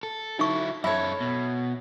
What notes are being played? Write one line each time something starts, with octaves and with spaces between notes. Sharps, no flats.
A4
F#3 D#4 E4 C#6
F#2 E4 A4 C#5 E5
B2